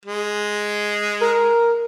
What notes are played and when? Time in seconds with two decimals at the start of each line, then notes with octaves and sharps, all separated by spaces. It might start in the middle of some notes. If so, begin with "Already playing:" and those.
0.05 G#3
1.21 A#4